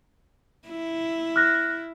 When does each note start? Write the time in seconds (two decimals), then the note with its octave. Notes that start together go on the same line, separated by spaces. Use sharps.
0.68 E4
1.36 F6 F#6 A#6